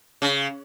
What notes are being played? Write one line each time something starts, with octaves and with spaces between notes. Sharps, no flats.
C#3